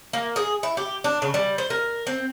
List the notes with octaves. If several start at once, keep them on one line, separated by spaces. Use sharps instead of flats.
A#3
G#4
E4
G4
D4
C#3
G3
C5
A#4
C4